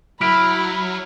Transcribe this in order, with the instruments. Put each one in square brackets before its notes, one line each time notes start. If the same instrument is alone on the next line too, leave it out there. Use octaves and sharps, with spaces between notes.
[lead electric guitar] F#3 [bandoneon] E4 [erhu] B5 [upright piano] F6 B6 D7